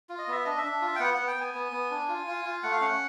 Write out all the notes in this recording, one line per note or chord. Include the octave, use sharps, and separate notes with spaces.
F4
D#5
B3 E5
D4 D#5
E5
D4
F4
G5
B3 F#5
B3 F#5
G5
B3 G#5
B3
B3
D4
F4
F4
F4
A3 F#5
F5
C#4 F#5